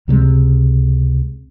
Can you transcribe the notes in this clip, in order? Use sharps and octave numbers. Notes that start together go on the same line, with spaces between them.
C#2 C3 F#3 G#3